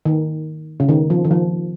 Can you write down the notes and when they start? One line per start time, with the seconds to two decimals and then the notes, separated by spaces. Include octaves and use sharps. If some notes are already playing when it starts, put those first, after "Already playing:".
0.05 D#3
0.80 C#3
0.89 D#3
1.10 F3
1.25 D#3
1.31 F3